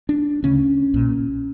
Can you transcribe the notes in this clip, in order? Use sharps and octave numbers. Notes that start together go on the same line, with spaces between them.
D4
D2 C#3 C#4
B1 A#2